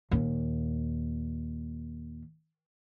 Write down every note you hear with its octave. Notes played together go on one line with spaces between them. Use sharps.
D#2 A#2